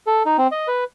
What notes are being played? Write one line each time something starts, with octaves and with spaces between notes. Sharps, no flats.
A4
D#4
C4
D#5
B4